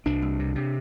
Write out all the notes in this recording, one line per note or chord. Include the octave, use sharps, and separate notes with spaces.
C2 D4
C2
C3
C3